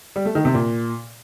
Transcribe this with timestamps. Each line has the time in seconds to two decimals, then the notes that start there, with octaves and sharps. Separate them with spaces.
0.16 G3
0.25 A3
0.35 D#3
0.45 C3
0.55 A#2